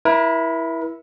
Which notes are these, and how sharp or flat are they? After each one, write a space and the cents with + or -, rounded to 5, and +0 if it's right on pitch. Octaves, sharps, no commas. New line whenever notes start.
E4 +0 A#4 +40